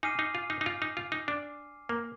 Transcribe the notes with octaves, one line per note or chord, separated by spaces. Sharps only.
D#4 G#5 D6 F6 C7 D#7
D#4
F4
D#4
D#4
F4
D#4
F4
D#4
D4
A#3